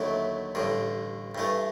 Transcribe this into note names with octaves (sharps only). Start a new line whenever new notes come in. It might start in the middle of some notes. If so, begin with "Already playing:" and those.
Already playing: D#2 D3 F#3 A3 E4
A1 G2 D3
G2 E3 A3